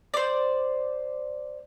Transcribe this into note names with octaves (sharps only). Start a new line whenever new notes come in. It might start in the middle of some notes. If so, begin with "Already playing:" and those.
C5 D5